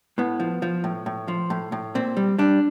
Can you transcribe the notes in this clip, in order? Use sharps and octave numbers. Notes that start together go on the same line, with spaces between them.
A2 B3
F3
F3
A2
A2
F3
A2
A2
A#2 C4
G3
G3 D4